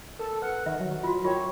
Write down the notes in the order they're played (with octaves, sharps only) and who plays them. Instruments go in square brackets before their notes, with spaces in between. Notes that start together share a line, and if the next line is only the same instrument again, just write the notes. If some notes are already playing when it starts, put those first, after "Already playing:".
[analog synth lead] A4 [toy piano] A#4
[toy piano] B4 [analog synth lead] F#5
[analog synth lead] D#3 [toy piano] E5
[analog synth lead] F#3
[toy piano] F4 F#4
[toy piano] F4 A#4 G5 [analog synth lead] C#5